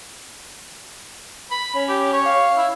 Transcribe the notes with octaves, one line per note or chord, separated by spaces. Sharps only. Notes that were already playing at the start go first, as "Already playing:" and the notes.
B5
C#4
G4
C#5
F5
E4